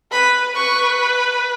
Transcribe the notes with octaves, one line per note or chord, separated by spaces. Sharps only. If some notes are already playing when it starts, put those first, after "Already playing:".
B4 B5
B4 C#6